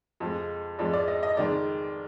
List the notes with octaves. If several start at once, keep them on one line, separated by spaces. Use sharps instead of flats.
F2 F3 G#3
F2 F3 G#3 D5
D5
D#5
D#5
F2 D#3 G#3 D5